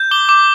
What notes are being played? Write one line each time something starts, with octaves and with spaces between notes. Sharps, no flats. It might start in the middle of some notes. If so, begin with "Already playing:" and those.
Already playing: G6
D6 G7
D6